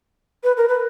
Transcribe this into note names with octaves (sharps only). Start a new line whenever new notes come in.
B4
A#4
B4